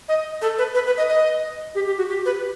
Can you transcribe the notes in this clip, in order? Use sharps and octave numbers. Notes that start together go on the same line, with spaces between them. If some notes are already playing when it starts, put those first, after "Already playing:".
D#5
A4
B4
B4
B4
D#5
D#5
G4
G4
F#4
G4
B4